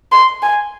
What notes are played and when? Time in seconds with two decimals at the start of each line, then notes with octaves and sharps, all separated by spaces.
0.12 C6
0.42 G#5